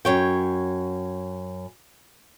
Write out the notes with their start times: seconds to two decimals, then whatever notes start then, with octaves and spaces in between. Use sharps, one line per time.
0.05 F#2 C#5 G5